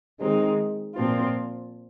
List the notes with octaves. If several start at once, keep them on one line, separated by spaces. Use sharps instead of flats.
D#3 G#3 C4 D#4
A#2 F3 C4 F4